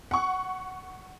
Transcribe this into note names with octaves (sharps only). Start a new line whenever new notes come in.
F#5 C#6